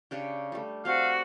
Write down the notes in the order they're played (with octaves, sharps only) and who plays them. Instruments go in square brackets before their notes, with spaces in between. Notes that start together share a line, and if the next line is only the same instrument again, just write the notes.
[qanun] C#3 D4 G4
G3 A3
[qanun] G3 C4 [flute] F#4 [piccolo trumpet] F5